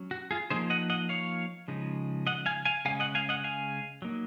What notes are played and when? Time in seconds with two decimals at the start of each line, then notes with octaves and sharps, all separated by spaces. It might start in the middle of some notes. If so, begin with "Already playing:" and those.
Already playing: F#3 C#4
0.11 F#4
0.31 F4 G#4
0.50 F3 A#3 D#4 G#4 C5
0.70 D#5 F#5
0.90 D#5 F#5
1.09 C#5 F5
1.68 C#3 F3 G#3 D#4
2.27 D#5 F#5
2.46 F5 G#5
2.65 F5 G#5
2.85 C#3 G#3 C#4 F5 G#5
3.00 D#5 F#5
3.15 F5 G#5
3.29 D#5 F#5
3.44 F5 G#5
4.02 F#3 A#3 D#4